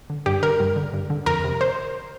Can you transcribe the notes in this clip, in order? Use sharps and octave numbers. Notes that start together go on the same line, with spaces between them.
D3
G2 G4
D3 A#4
G2
D3
G2
D3
F2 A#4
C3
C5